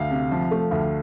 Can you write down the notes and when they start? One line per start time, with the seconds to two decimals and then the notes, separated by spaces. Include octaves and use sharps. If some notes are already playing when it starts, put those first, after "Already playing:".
Already playing: D2 F5
0.11 C3
0.31 F3
0.51 A3
0.71 D2